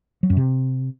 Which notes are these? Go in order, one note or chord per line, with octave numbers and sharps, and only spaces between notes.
F#3
F#2
C3